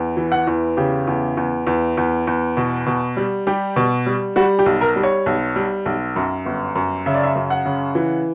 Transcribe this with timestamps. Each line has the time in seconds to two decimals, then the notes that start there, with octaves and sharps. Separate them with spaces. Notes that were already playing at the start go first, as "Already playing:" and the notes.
Already playing: E2
0.17 E3
0.32 F#5
0.47 E2
0.77 C#3 G4
1.07 E2
1.37 E2
1.67 E2
1.97 E2
2.27 E2
2.57 B2
2.86 B2
3.17 G3
3.47 G3 G4
3.76 B2
4.06 G3
4.36 G3 F#4
4.59 G4
4.66 B1
4.81 A#4
4.96 G3
5.03 C#5
5.26 B1
5.56 G3
5.86 B1
6.16 F#2
6.46 G1
6.75 F#2
7.06 C#3 E5
7.14 D5
7.23 E5
7.35 F#2
7.50 F#5
7.66 C#3
7.95 E3